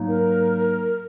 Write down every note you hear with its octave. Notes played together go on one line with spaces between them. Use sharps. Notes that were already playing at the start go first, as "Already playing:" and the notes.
Already playing: G#2 F#3 A#3 D#4
A#4